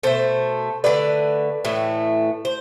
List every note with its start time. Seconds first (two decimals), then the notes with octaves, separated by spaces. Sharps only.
0.03 B2 A3 A4 C5
0.84 D3 A3 B4 D5
1.65 A2 E3 A3
2.45 C5